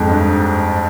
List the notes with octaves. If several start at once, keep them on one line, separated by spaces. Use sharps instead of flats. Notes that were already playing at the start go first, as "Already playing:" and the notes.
Already playing: F2 G#2
G2